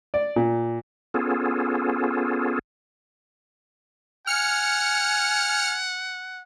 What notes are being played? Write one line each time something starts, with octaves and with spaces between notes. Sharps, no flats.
D5
A#2
B3 C#4 F4 G#4 A4
F#5 G#5 F6 C#7